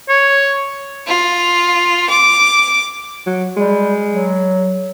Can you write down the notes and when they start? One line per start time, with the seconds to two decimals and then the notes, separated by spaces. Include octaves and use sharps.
0.09 C#5
1.07 F4
2.09 D6
3.26 F#3
3.57 G3 G#3
4.10 F#3